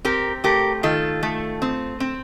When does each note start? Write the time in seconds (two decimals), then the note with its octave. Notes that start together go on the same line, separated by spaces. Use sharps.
0.05 C4 G4 A#4
0.44 A3 G4 A#4
0.83 D#3 F4 A4
1.23 A3
1.62 C4
2.00 C4